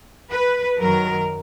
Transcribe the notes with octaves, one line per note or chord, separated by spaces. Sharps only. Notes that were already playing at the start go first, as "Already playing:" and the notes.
B4
F#2 D#3 F#3 A#4